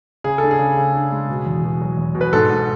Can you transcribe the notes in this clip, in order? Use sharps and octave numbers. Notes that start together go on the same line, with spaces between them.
C#3 G#4
D4 A4
G#4
C#3
C#3
D4
G#3
B2
E2
B2
F#3
E2
B2
B4
G#2 A4
G#2